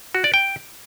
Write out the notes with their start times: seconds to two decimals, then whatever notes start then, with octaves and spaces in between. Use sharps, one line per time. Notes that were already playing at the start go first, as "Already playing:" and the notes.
0.15 F#4
0.24 D5
0.34 G5